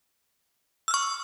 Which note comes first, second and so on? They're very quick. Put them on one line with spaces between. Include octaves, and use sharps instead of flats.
E6 F6 C#6